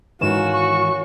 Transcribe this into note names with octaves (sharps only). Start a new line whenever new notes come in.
G#2 D#3 E3 C#4 F4 F#4 A#4 E7
C#6